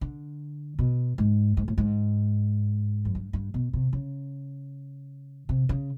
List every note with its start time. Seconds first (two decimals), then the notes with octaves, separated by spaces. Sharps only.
0.01 D3
0.79 B2
1.18 G#2
1.57 G#2
1.68 A2
1.78 G#2
3.05 F#2
3.15 G2
3.33 G2
3.54 B2
3.73 C3
3.93 C#3
5.49 C3
5.69 C#3